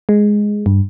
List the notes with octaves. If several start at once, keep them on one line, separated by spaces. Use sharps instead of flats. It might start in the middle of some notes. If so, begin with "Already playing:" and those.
G#3
G2